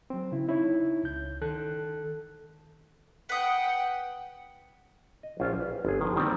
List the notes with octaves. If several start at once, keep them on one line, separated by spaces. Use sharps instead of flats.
F#3 C4
C#3 E4
D#4 E4 C#5
C#2 G6
D#3 A4 F#6
B4 F#5 G5 D#6
D#5
A#1 C#4 F4 C5 G5 G#5
B4
G1 G#4
D#3 F3
D#3 G3 A#3 C4 G4 D5